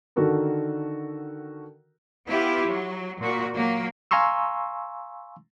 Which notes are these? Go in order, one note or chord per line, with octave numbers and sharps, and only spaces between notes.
D3 D#3 F#4 A4 A#4
B3 E4 F4 G4
F#3
A#2 F#4
F#3 A#3
F5 G#5 A#5 C6 C#6 E6